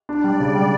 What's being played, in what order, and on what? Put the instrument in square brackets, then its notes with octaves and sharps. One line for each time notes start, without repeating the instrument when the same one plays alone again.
[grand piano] D4 [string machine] D5
[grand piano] G3
C#3
G3